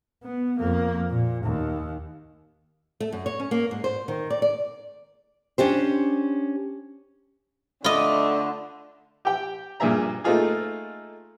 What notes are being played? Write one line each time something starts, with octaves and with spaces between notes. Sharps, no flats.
B3
F2 A#3
A#2
D#2
A3
F#2
C#5
C#4
A#3
G#2
C5
D#3
D5
D5
C#4 D4 G4 C5
D3 A3 F4 D#5 B5 D6
G4 G5
G2 A#2 A#3 G#4 E5 A#5
A3 A#3 D#4 F4 G#4